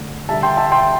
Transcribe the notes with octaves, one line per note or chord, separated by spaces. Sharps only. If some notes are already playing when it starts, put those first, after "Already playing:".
Already playing: D3 A3
D3 G3 E5 A5
G5 C6
E5 A5
G5 C6